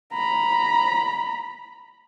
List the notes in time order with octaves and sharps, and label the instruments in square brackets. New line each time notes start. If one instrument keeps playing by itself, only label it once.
[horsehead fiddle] A#5 B5